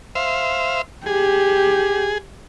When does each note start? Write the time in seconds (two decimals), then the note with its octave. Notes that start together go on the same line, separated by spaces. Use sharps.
0.15 C5 E5 F5
1.06 G4 G#4